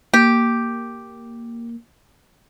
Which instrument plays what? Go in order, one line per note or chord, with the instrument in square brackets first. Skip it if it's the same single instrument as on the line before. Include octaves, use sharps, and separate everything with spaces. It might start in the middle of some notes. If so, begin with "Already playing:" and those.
[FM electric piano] A#3 [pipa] G4